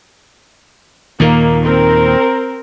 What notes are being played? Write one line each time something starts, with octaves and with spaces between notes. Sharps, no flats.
D#2 A#2 D#3 A#3
C4 A#4